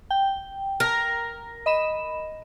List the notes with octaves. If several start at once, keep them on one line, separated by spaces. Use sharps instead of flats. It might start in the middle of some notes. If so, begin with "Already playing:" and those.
G5
A#4
D#5 B5 E7